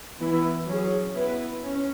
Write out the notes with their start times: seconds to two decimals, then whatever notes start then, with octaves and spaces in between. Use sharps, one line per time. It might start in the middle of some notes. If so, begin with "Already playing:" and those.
0.20 E3 B3 E4
0.68 F#3 C#4 G#4
1.15 B3 E4 B4
1.63 C#4